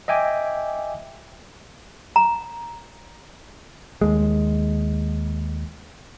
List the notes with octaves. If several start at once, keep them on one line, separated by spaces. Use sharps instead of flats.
D#5 E5 G5 G#5 D6
A#5
D#2 G#3